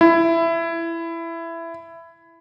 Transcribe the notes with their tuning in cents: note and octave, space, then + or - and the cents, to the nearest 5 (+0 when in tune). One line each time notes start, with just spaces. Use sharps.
E4 +15